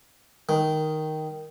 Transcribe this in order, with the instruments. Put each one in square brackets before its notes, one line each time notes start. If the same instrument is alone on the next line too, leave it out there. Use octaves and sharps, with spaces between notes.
[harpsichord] D#3